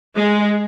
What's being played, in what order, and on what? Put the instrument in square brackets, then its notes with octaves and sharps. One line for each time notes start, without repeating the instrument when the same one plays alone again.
[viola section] G#3